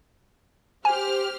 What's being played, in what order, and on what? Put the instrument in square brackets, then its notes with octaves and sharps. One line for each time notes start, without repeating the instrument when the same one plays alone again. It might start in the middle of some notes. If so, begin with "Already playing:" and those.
[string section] G4 C5 F6 [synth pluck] G#5